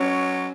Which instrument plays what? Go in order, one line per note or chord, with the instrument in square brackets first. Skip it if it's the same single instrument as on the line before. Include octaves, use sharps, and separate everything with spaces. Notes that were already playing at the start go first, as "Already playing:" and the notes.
Already playing: [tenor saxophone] F#3 [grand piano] C#4